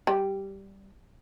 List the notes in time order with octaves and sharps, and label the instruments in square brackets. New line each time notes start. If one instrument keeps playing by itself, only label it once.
[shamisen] G3